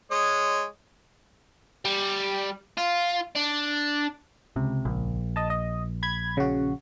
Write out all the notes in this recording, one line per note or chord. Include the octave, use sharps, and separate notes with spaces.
G#3 C#5 D#5
G3
F4
D4
C#2 C3
A#1
D#5 A5
D#5
B5 G#6
C#3 F#4